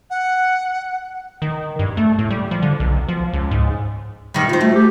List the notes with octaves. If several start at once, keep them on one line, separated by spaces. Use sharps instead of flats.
F#5
D#3
G2
A3
A2
G3
F3
D3
B1
F3
C#2
G#2
G2 D#3 G3
D#4 F4 C5
A3 F#4
G4